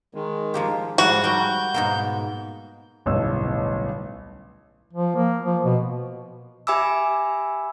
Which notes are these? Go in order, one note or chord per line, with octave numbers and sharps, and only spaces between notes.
D#3 G#3
F3 A#3 G4
G#2 F3 G3 F#4
G3 A#4 G5 G6
G#2 B2 A#3
D1 B1 G2 C#4 E6
F3
A#3
F3
B2
G4 E5 G#5 B5 D6 E6